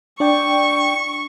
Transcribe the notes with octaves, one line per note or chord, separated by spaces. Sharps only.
D4 D5 G5 C#6